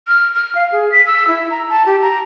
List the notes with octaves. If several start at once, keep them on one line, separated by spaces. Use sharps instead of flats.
F6
F6
F5
G#4
B6
E6
E4
A#5
A5
G4
A#5